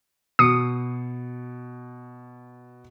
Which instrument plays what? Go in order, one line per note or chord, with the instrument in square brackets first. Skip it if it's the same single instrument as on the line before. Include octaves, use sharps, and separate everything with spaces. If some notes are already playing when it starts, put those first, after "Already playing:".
[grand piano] B2 C7 C#7 [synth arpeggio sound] D#6